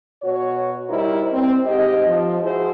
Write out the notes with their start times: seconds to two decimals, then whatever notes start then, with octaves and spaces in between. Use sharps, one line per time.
0.23 B2 F#4 C#5
0.89 G3 D#4 E4 A#4 C5
1.32 C4
1.65 G#2 G4 D#5
2.06 F3
2.42 E4 F#4 G#4 C5